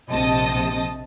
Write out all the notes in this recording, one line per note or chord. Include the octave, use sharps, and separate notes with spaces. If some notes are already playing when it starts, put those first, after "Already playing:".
A#1 C3 D#5 A5 D#6